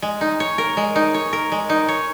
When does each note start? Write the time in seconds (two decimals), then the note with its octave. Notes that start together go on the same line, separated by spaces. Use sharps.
0.02 G#3
0.21 D#4
0.40 C#5
0.58 A#4
0.77 G#3
0.96 D#4
1.14 C#5
1.33 A#4
1.52 G#3
1.70 D#4
1.89 C#5